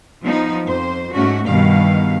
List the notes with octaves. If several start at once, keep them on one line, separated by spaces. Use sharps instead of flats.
F3 B3 D#4
F2 C5
G#2 A3 C#4 F#4
G2 B2 D#3 F5